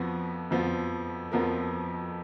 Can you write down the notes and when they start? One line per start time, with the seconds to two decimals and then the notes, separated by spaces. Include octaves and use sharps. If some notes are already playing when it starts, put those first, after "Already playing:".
Already playing: F2 F3 B3 F#4
0.51 F2 F3 B3
1.32 F2 F3 B3 A#4